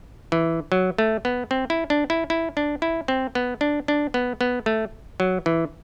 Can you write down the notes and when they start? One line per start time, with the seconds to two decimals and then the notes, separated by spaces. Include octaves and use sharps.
0.32 E3
0.72 F#3
0.98 A3
1.25 B3
1.51 C4
1.70 E4
1.90 D4
2.10 E4
2.30 E4
2.57 D4
2.82 E4
3.08 C4
3.35 B3
3.61 D4
3.88 D4
4.14 B3
4.41 B3
4.66 A3
5.20 F#3
5.46 E3